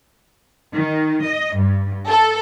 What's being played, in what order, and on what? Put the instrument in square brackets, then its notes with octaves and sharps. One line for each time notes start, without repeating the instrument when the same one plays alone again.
[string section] D#3
D#5
G2
A4